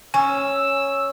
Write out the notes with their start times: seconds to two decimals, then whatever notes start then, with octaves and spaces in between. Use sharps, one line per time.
0.14 C#4 G#5 E6